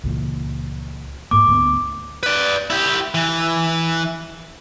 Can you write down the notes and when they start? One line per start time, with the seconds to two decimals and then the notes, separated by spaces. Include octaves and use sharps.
0.04 C#2 A#2 E3
1.31 G#2 A#3 D6
1.47 D2 B3
2.23 B4 D5
2.70 E4 G4
3.14 E3